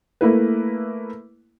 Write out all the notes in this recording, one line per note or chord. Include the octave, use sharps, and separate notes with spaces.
A3 A#3 E4 B4